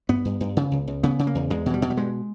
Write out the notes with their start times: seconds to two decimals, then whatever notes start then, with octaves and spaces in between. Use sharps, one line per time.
0.09 G2 B3
0.25 G2
0.40 G2
0.57 C#3
0.72 C#2
0.88 C#2
1.03 C#3 B3
1.19 C#3
1.27 A#3
1.35 E2
1.50 E2 G#3
1.66 B2 E3
1.74 G3
1.82 B2
1.90 G3
1.97 G2 G#3